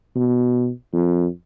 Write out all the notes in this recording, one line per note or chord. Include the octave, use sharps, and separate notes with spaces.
B2
F2